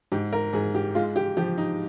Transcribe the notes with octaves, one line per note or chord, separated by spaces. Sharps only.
G#2 G4
A#4
G#2 G#4
G4
G#3 F4
G4
F3 G4
D#4